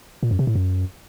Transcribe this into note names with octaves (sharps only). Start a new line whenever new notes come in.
A#2
F#2
C3
A2
F#2